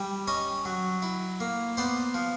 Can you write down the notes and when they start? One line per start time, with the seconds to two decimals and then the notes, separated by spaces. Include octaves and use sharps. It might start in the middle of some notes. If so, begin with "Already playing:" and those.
Already playing: G3
0.27 C#4 C#5 D#5
0.65 F#3
1.02 E4
1.40 A#3
1.77 B3 C5 D5
2.14 F3